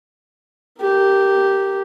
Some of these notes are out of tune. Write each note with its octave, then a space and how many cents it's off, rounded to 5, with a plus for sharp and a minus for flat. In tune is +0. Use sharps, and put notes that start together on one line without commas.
G4 -5 A#4 -15